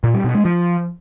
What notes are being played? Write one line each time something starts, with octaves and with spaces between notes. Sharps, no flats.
A#2
G3
B2
G#3
F3